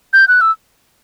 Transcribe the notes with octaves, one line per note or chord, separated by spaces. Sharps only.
G6
F#6
E6